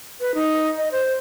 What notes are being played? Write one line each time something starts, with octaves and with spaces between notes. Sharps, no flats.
B4
D#4
D#5
C5